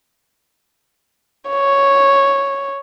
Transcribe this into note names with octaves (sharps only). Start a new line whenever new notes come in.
C#5